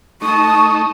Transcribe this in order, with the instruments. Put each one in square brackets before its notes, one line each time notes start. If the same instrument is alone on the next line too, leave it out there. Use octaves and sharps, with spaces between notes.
[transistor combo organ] A3 D#4 [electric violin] A5 D#6 [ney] C#6